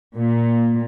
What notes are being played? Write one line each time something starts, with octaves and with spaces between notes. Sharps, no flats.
A#2